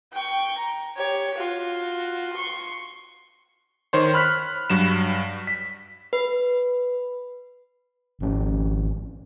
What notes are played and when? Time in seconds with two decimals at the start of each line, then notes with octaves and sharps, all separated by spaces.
0.13 G5 C#6
0.58 A#5
0.97 G4 C#5
1.35 F4 F#4
2.33 C6 C#6
3.93 D#3 C5 C#5
4.14 B5 F6 F#6 B6
4.70 G2 F#3 E7
5.47 B6
6.13 B4
8.20 G#1 C#4